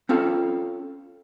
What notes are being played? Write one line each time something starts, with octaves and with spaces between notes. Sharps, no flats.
C4 C#4 F4 A4